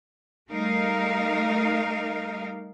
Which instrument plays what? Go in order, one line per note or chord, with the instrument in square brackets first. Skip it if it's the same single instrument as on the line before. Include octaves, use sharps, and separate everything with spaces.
[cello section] G3 A3 D#4 A#4 F5